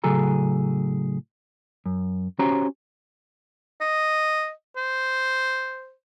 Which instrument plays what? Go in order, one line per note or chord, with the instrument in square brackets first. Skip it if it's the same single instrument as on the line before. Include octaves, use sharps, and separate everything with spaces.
[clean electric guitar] A2 C#3 F#3 G#4 A4 A#5
F#2
C#4 F#4 G4 C5 C#5 A#5
[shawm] D#5
C5